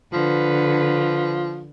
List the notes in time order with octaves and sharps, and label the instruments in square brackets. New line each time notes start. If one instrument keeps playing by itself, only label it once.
[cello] D3 B4 [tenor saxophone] F3